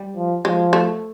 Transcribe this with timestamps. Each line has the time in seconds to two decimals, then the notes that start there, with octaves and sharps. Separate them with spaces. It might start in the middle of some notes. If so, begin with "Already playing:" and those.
Already playing: G3
0.16 F3
0.45 F3 G#3
0.73 A3